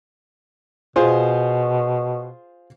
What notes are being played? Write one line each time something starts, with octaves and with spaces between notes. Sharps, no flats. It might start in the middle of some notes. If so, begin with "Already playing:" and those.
B2 F4 G#4 C5